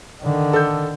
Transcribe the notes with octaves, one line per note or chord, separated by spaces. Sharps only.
D3 D#3
A4 G6